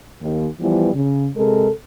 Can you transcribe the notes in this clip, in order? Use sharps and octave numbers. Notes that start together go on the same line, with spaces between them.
D#2
E3 F3 G3 B3
C#3
C3 G#3 A4 A#4